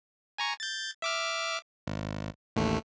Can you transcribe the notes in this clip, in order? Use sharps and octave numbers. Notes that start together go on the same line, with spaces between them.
G#5 A#5 C#6
G6 A6
E5 D6 F6
G#1
A1 D#2 A3